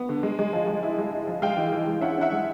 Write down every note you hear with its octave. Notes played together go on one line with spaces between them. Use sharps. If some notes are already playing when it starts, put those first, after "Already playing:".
Already playing: B3
D3
G#3
G#3
F3
G#3
E4
G#3
E4
F3
G#3 F5 G5
E3
E3
G#3
C#4 E5 F#5
C#4 E5 F#5
G#3